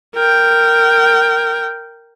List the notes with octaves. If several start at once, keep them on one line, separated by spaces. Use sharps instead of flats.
A#4 G5